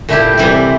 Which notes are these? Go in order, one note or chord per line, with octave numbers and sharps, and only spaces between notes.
A#2 A3 E4 G4
C3 E3 G3 C4 E4